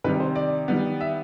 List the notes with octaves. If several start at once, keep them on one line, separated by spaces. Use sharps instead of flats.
C3 D#3 G3 B4
C5
D5
D#3 G3 B3
E5